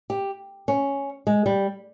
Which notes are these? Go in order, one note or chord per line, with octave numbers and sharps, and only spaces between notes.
G4
C#4
G#3
G3